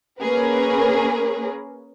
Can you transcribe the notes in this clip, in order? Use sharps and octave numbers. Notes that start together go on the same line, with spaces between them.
A#3 C#4 G#4 A#4 B4